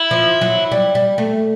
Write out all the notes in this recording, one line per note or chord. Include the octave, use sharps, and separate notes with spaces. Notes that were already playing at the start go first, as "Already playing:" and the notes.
Already playing: E4
F3
F#3
G3
G3
A3